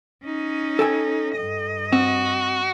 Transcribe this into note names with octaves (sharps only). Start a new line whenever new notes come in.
C#4 D#4
A4 G5 G#5
G2 D#5
C4 F#4